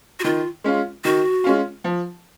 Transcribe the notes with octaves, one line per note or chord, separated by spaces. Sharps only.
F#4
D#3 F4
G#3 C#4 F4
D#3 F#4
G#3 C#4 F4
F3